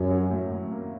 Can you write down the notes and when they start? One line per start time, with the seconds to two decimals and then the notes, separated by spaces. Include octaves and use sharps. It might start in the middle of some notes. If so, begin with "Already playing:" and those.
Already playing: F#2 C#4
0.10 F#3
0.31 A2
0.51 A2
0.71 A#3